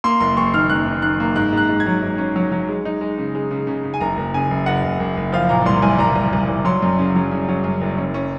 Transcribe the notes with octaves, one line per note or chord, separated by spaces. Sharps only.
A#3 C6
F#1 C6
F#1 C#6
D#3 F6
F#2 F#6
D#3
D#3 F#6
A#3
G#2 F#6
G#2
F#6
G#2
G#6
F#3
G#2
C#4
F#3
F#3
G#3
D#4
G#3
C#3
G#3
C#3
C#3
C#3
G#5
F#1 A#5
F#1
C#3 G#5
F#1
F#1 F#5
F#1
F#1
F#1
F3 F5
A#2 A#5
C2 C6
C2 G#5
C2 A#5
C2
C2
C2
F#3 C6
F#2
C#3
F#3
C#3
F#3
F#2
F#1
C#4
C#4